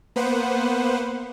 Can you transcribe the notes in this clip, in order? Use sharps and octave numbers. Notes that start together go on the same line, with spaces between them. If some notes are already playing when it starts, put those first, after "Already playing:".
A#3 B3 B4 C5 F#5